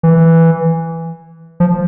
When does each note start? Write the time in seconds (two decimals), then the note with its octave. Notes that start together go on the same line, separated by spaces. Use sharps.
0.03 E3
1.60 F3